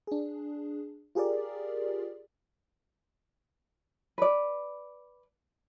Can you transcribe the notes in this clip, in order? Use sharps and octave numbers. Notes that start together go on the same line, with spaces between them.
D4 G#4
F4 G4 G#4 A#4 D5
B4 D5